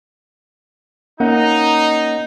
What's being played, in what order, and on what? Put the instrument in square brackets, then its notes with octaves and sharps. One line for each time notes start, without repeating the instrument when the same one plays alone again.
[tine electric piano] A#3 C#4 F#5 [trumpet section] D#4